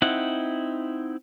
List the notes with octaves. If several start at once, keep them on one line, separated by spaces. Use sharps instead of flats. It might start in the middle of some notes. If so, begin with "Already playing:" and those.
C4 D#4 E4 F#5